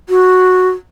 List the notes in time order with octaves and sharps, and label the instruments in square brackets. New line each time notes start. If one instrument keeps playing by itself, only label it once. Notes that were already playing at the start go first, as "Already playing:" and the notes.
[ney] F#4